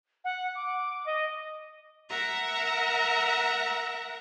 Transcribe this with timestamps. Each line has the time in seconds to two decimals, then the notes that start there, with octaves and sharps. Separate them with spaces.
0.24 F#5
0.55 D6
1.06 D#5
2.08 A#4 E5 F#5 A#5